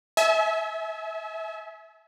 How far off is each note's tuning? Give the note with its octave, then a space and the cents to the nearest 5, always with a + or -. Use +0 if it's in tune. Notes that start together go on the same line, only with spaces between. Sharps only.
E5 -20 G#5 +40